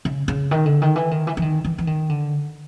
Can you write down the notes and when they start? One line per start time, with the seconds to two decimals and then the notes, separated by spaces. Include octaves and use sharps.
0.05 C#3
0.28 C#3
0.51 D#3
0.66 D3
0.82 D#3
0.96 E3
1.11 D#3
1.27 E3
1.37 E3
1.42 D#3
1.65 E3
1.78 E3
1.87 D#3
2.09 D3